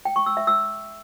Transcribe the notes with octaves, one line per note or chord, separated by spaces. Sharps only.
G5
C#6
E6
E5
E6